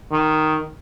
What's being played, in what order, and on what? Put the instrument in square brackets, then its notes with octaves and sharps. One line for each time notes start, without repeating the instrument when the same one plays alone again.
[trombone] D#3